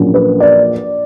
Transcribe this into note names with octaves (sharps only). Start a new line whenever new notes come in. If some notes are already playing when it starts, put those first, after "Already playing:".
Already playing: A#1 A#2 F#3 A#3 C#4
B4
D5